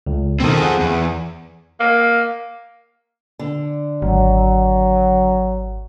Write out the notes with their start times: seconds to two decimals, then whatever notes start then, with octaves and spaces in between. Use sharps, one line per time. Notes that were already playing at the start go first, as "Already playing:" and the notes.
0.07 C#2
0.40 B2 D#3 C4 A4
0.58 G#4 F#5
0.80 E2
1.80 A#3
3.39 D3
4.02 G#1 F#3